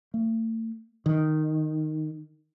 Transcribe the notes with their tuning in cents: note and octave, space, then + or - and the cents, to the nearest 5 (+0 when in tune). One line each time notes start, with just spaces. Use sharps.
A3 +40
D#3 -5